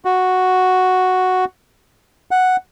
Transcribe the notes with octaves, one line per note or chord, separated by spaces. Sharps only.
F#4
F#5